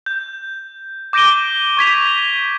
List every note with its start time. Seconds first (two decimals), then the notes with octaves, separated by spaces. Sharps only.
0.06 G6
1.13 D6 G6 A#6 D7 D#7 G7
1.77 C#6 G#6 B6 F7